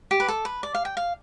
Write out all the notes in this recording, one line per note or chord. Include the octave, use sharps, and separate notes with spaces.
G4
B4
A4
B4
D5
F5
G5
F5